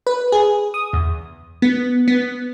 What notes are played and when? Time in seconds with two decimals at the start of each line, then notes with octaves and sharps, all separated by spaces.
0.07 B4
0.32 G#4
0.74 D#6
0.93 E2
1.62 B3
2.08 B3